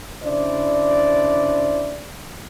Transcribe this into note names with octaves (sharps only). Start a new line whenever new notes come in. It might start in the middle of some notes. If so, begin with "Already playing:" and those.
C#3 D4 E4 C5 D5